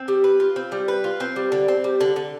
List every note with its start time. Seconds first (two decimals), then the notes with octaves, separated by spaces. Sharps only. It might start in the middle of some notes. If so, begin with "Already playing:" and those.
Already playing: C4
0.08 G3
0.24 B4
0.40 F4
0.56 C4
0.72 G3
0.88 B4
1.04 F4
1.20 C4
1.36 G3
1.52 D3
1.68 C4
1.84 G3
2.01 D3
2.16 D3